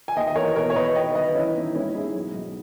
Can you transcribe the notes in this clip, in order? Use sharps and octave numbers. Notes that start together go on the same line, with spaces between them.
G#5
D#2 D#5 G5
D#5
E3 A#4 C#5
B2 A#4 C#5
C#5
B2 B4 D#5
D#3 D#5 G5
G1 B4 D#5
E3 C#4 E4
D#2 D#4
G#1 C#4 E4
G#2 E4 G#4
B1
B1